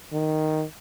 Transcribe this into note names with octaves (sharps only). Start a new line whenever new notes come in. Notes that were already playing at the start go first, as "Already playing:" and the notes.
D#3